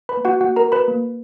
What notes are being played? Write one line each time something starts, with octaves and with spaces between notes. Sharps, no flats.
B4 B5
A#3
F#4 F#5
A#3 F#4 F#5
A#4 A#5
F#4
B4 B5
A#3